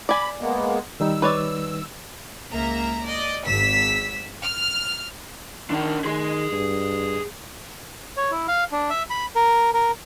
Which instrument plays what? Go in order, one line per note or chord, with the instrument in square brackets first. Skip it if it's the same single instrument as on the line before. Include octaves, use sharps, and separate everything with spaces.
[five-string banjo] D5 G#5 [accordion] B5
[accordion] G#3 A#3 B3
[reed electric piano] D#3 G3 D#4 [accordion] E6
[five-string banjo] B4 C#5 D5
[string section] C#2 A#3 E5 A#5
D5 D#5
G#1 E6 B6
F6
[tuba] D#3 [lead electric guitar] D4 A#4
[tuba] D#3 [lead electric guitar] G#4 C6
[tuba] G2
[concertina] C#5
E4
F5
D4
E5
B5
A#4
A#4